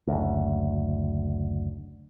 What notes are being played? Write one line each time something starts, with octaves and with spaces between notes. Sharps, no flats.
F#1 D2